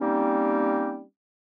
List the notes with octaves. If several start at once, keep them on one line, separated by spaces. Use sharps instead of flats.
G3 A#3 C4 C#4 D#4